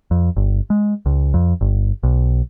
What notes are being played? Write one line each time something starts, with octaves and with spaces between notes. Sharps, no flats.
F2
G1
G#3
C#2
F2
G1
B1